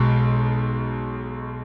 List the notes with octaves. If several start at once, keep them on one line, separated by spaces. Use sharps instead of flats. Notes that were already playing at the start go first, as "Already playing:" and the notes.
Already playing: B1 B2 G#3